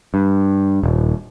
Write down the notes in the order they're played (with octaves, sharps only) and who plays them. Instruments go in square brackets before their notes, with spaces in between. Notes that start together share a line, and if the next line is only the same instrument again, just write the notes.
[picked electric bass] G2
D#1